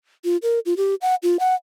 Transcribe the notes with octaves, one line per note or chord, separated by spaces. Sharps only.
F4
A#4
F4
G4
F#5
F4
F#5